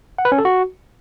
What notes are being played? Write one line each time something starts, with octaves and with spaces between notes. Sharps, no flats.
F#5
B4
C#4
A4
F#4